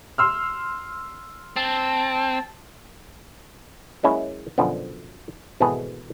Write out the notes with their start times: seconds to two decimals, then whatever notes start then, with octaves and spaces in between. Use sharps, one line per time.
0.18 C6 E6 F6
1.56 C4 A5
4.03 F#3 G#3 A#3 C#4 E4
4.58 F#2 B2 D3 F3
5.60 G#1 B2 E3 B3 G#4 A4